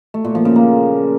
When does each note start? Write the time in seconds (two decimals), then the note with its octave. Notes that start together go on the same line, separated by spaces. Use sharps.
0.14 A3
0.25 A#2
0.35 F3
0.45 C#3
0.56 A#3